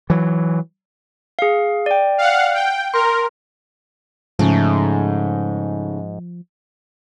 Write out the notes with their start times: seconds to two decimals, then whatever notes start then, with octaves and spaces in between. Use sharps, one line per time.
0.10 E3 F#3
1.39 G#4 F5
1.86 D5 G5
2.18 F5 F#5
2.54 G5
2.94 A#4 C6
4.39 G#2 C#3 F3 A3 D#4